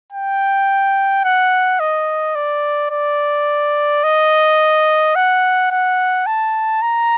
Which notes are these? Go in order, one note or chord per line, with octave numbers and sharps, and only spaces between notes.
G5
F#5
D#5
D5
D5
D#5
F#5
F#5
A5
A#5